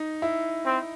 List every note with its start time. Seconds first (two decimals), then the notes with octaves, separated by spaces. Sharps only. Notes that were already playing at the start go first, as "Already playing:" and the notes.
Already playing: D#4
0.22 E4
0.65 C4